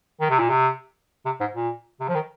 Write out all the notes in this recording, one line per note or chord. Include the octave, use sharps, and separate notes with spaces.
D#3
C3
A#2
C3
C3
G#2
A#2
C3
F3
D#3